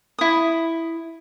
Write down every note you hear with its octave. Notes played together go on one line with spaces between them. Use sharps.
E4 D#6